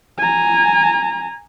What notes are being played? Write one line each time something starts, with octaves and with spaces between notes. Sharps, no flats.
G#5 A#5